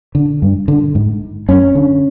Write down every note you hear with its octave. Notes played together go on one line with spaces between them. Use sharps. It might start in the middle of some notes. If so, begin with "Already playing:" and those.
D3
G2
D3
G#2
F#2 C#4
D3